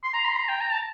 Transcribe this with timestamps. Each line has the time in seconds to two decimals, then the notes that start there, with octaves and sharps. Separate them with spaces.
0.03 C6
0.13 A#5
0.25 C6
0.36 A#5
0.48 G5
0.61 A#5
0.72 A5